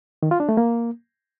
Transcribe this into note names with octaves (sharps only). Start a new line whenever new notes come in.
D#3
F4
D4
A3
A#3